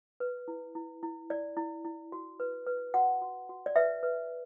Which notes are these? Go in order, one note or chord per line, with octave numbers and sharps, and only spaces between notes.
B4
E4
E4
E4
E4 D5
E4
E4
F#4
B4
B4
F#4 F#5
F#4
F#4
D5
B4 E5
B4